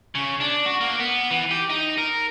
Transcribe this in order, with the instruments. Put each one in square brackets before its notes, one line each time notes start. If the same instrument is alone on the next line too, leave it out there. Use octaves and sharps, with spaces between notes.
[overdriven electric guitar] C#3
D4
F#4
A#3
B3
E3
G4
D#4
A#4